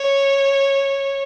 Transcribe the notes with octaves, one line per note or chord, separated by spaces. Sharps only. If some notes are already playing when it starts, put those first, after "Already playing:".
Already playing: C#5